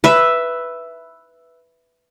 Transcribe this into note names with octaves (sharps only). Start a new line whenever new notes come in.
B4 E5